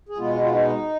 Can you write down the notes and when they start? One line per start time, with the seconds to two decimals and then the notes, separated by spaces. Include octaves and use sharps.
0.09 G#4
0.17 B2 G#3 B3 F4
0.40 F4
0.51 D#4